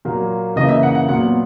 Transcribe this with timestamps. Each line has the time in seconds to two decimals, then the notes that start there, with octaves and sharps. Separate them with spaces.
0.05 A#2 F#3 A#3
0.56 C#3 E3 A#3 D#5
0.69 E5
0.83 F#5
0.95 F#5
1.08 A#2 F#3 B3 F#5